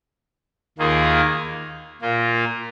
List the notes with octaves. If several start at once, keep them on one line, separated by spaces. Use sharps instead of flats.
D#2 D#3 A#3 F4 G#4
A#2 A#3 F4